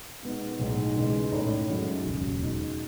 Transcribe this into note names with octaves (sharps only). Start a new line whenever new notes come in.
B2 G#3 B3 D#4
B1 A2 G#3 D#4
C#3 E3 G#3 D#4 G#4
A2 G#3 D#4 A4 C#5
F#2 D#3 G#3 C#4 F#4
E1 D#2 C#3 F#3
B2 G#3 D#4